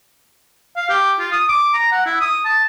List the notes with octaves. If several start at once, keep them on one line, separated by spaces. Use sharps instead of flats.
F5
G4
F4
D#6
D6
A#5
F#5
E4
D#6
A5